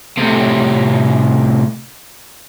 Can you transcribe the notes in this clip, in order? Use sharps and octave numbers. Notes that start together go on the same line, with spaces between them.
A2 C3